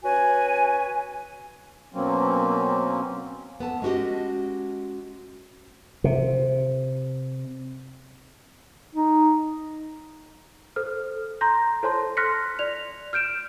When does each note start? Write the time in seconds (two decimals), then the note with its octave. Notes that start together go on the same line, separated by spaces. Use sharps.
0.04 C#4 F#4 B4 G#5
1.94 B2 F#3 A#3 C4 C#4
3.60 B3 A4 A5
3.82 G#3 C#4 F#4 G4 D#5
6.04 C3
8.95 D#4
10.76 A4 C5 F6
11.41 A#5 C6 G6 A#6
11.83 A4 C5 C#5 A5 C6
12.17 C6 F6 F#6 A#6 B6 C#7
12.59 D5 F7
13.13 F6 G6 D7 E7